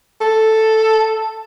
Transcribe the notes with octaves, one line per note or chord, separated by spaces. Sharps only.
A4